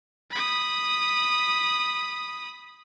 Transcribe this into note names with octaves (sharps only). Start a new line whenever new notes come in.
B5 D#6